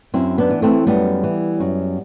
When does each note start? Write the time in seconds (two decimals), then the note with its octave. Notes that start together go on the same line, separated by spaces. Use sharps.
0.14 F#2 C4 E4
0.38 B3 D4
0.50 E3
0.62 A3 C4
0.87 F#2 G3 B3
1.23 E3
1.60 F#2